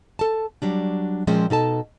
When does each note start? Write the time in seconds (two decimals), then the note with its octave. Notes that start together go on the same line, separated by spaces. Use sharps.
0.19 A4 A5
0.62 F#3 G3 D4
1.27 A#2 F3 G#3 C4 C#4
1.50 B2 D#4 A4 A5